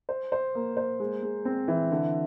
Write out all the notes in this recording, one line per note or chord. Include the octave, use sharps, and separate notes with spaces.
C5
C5
A#3
C5
G#3
G#3
C4
E3
D3